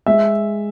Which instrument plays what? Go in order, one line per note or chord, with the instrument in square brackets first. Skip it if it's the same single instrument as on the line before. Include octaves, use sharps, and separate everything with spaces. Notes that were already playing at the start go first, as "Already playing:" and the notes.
[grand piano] G#3 E5